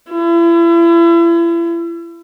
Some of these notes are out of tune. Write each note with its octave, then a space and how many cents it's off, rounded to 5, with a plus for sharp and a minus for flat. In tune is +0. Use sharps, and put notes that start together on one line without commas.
E4 +35